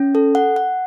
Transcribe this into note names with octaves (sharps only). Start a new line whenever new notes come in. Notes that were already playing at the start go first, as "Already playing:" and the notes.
Already playing: C#4
A4
F#5
F#5